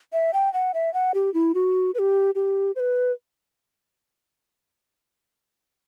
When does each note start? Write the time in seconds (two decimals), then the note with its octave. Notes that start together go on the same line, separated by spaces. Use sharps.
0.13 E5
0.33 G5
0.54 F#5
0.74 E5
0.94 F#5
1.14 G4
1.34 E4
1.55 F#4
1.95 B4
1.99 G4
2.35 G4
2.76 C5
2.80 B4